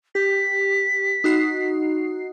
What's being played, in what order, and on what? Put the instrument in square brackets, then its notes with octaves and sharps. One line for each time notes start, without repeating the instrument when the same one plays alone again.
[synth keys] G4 [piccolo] B6
[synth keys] D#4 F#4 C7